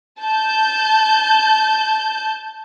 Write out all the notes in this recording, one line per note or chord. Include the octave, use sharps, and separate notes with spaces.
A5 G6